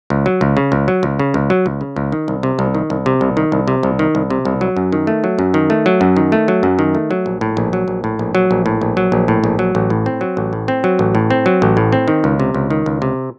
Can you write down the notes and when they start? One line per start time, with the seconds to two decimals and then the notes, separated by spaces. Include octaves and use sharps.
0.10 C#2
0.26 F#3
0.41 C#2
0.57 C#3
0.72 C#2
0.88 F#3
1.03 C#2
1.19 C#3
1.34 C#2
1.50 F#3
1.66 C#2
1.81 C#3
1.96 C#2
2.12 D#3
2.28 C2
2.43 C3
2.59 C2
2.75 D#3
2.90 C2
3.06 C3
3.21 C2
3.37 D#3
3.52 C2
3.68 C3
3.83 C2
3.99 D#3
4.15 C2
4.30 C3
4.45 C2
4.61 F#3
4.77 F#2
4.92 D#3
5.07 A3
5.24 F#3
5.39 F#2
5.54 D#3
5.70 A3
5.86 F#3
6.01 F#2
6.16 D#3
6.32 A3
6.48 F#3
6.63 F#2
6.79 D#3
6.95 A3
7.11 F#3
7.26 A#1
7.41 A2
7.57 A#1
7.73 F#3
7.88 A#1
8.04 A2
8.19 A#1
8.35 F#3
8.51 A#1
8.66 A2
8.81 A#1
8.97 F#3
9.12 A#1
9.28 A2
9.44 A#1
9.59 F#3
9.75 A1
9.90 A2
10.06 C4
10.21 F#3
10.37 A1
10.53 A2
10.68 C4
10.84 F#3
10.99 A1
11.15 A2
11.30 C4
11.46 F#3
11.62 A1
11.77 A2
11.92 C4
12.08 D#3
12.24 C#2
12.40 C3
12.54 C#2
12.70 D#3
12.86 C#2
13.02 C3